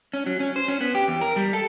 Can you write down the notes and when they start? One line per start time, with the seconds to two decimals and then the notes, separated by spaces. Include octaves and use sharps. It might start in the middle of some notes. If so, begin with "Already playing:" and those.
0.14 C#4
0.26 F#3
0.40 C#4
0.56 C5
0.68 C#4
0.81 B3
0.95 G4
1.08 E2
1.21 A#4
1.36 G3
1.53 A4